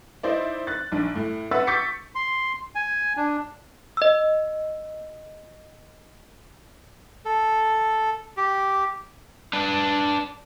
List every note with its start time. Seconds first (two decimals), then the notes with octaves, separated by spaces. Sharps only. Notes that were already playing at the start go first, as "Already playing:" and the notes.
0.23 D#4 E4 C5 D5
0.67 F#6 A6
0.92 A#1 D4
1.15 A2
1.51 B4 E5 F#5 E6 A6
1.67 C#6 D6 G6 A6 B6 C#7
2.15 C6
2.75 G#5
3.17 D4
3.97 D#5 E6
7.25 A4
8.37 G4
9.53 D4 B4